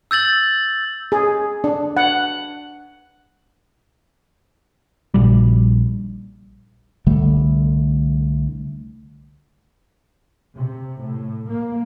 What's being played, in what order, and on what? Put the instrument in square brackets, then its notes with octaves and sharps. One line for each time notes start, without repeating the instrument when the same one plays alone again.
[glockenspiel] E6 G6 A6 F#7
[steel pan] G#4
D4
F#5
[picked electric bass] A#1 G3
[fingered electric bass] C2 D3 G3 A3
[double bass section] C3
A2
A#3